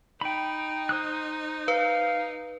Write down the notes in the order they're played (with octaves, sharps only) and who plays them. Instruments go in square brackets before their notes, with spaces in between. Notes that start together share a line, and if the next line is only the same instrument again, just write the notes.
[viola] D#4 [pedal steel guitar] G5 B5
[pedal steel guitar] C5 D#6 F#6
[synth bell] B4 [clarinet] F5